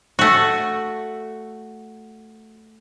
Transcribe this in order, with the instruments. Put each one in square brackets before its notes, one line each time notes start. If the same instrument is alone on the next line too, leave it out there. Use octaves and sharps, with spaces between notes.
[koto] A3 F#4